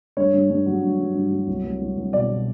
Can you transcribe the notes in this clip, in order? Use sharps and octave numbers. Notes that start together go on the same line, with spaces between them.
G2 C#5
G2
G2
F#3
G2
G2
G2
F#3
C2
C2
C2
C2
B2 D5
B2